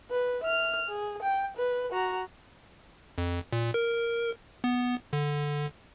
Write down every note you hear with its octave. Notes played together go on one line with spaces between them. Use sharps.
B4
E5 F6
G#4
G5
B4
F#4 A#5
F2
A#2
A#4
B3
D3